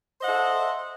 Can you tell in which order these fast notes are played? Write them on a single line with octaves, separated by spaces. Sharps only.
C5 D#5 F#5 E5 A4